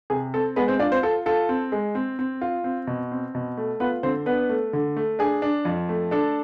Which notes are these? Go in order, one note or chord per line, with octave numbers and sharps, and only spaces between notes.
C3 G#4
C4 A4
G#3 B3 B4
C4 C5
D4 F4 D5
C4 C5
F4 A4
F4 A4
C4
G#3
C4
C4
F4
C4
B2
C4
B2
A3
B3 F4 B4
D3 C4 C5
B3 D4 B4
A3
D3
A3
D4 G#4
D4
F2
A3
D4 A4